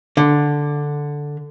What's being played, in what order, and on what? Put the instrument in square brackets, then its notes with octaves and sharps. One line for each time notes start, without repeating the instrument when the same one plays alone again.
[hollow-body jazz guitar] D3